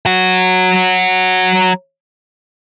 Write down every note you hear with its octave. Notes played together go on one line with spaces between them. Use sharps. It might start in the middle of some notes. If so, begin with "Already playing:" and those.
F#3 F#4